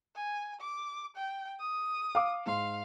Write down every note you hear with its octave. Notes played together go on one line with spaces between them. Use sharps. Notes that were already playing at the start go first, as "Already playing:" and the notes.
G#5
D6
G5
D#6
F5 D6
G#2 F5 C6